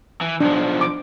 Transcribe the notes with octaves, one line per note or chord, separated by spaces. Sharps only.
E3
B1 F3 D4
D6